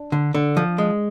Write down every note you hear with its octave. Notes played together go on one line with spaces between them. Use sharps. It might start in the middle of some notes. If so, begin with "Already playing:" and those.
Already playing: D4
D3
D3
F3
G#3